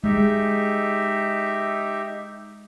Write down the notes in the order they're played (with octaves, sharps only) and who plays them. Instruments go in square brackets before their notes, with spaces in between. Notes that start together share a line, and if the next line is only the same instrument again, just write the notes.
[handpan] G#3 [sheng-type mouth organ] D#4 G4 E5